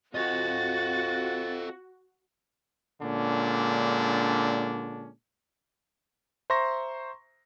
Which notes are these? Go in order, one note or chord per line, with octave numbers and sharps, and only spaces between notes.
C4 F4 F#4 A4 D#5 A6
A#2 D3 G#3 C#4 D4
C5 E5 A#5 C6 C#6 A#6